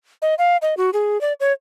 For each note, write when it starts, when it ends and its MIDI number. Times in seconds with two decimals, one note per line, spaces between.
0.22 0.35 75
0.38 0.57 77
0.62 0.74 75
0.77 0.90 66
0.93 1.20 68
1.21 1.33 74
1.40 1.53 73